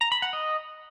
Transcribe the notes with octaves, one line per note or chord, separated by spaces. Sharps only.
A#5
B5
F#5
D#5